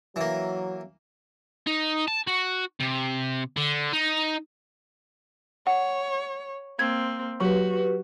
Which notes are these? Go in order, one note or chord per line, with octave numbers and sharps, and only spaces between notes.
E3 F#3 A#3
D#4
A5
F#4
C3
D3
D#4
C#5 F#5
A#3 C4 G#6
F#3 F#4 G4 B4